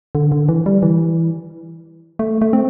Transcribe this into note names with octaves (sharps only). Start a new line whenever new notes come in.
D3
D3
E3
G3
E3
A3
A3
C4